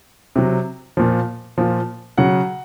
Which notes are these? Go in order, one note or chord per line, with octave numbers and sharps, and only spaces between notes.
C3 F#3
A#2 F3
A#2 F3
C#3 F#3 F#5